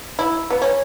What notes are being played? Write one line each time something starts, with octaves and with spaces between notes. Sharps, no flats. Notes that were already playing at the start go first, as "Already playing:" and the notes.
E4
B3
C#4